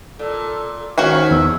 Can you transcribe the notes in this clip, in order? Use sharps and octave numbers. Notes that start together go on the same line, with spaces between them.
A#2 A4
G#2 D#3 C#4 F#4 A#4 B4 C#5 F5
E2 E6